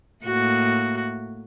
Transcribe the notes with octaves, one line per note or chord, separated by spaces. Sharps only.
A2 A#3 F#4